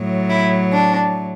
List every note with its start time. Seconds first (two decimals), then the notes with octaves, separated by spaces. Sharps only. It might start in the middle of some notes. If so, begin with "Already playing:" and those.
Already playing: A2 F#3
0.29 E4
0.71 D4